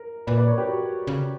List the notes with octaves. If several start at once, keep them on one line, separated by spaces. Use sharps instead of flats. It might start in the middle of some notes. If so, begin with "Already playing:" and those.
Already playing: A#4
A#2 B4 D5
B4 D5
A#4 C#5
G4 B4
F#4 A#4
C#3